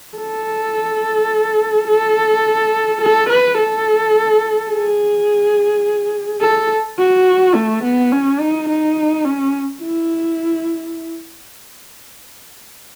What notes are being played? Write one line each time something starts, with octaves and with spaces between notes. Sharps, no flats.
A4
A4
A4
B4
A4
G#4
A4
F#4
A3
B3
C#4
D#4
D#4
C#4
E4